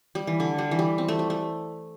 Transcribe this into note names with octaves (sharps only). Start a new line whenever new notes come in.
G3
E3
D3
G3
E3
G3
C4
A3
G3
A3